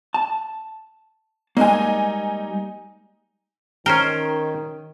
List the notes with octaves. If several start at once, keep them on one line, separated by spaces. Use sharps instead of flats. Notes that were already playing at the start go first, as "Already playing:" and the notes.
A5
G3 G#3 A#3 D#4 G#5
D#3 C#4 A#4 C5 G5